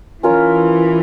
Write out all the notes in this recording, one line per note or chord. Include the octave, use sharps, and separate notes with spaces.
E3 C#4 F4 A#4 C#5